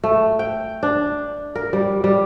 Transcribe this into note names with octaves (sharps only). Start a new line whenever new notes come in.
A3
G5
D4
A#4
G3
G3